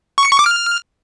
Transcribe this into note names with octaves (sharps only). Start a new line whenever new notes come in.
C#6
C#7
C#6
D6
F6